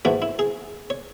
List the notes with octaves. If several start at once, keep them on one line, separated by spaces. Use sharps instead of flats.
G#2 E3 A3 F#4
E4
G#4
C#5